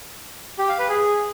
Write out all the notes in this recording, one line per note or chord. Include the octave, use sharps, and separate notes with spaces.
G4
F5
B4
G#4